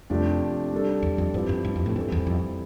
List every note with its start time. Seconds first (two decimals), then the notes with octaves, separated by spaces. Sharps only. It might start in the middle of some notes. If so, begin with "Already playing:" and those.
0.10 F2 C3 F3 A3 D4 G4
0.72 G3 D4 A4
1.03 E2
1.18 F2
1.34 G2 F3 C4 E4 G4 B4
1.49 G2
1.65 G2
1.76 F2
1.86 A2
1.96 G2 E3 G3 C4 E4 A4
2.12 E2
2.27 F2